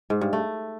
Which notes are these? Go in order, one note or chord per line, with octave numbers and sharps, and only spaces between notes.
G#2
G2
A3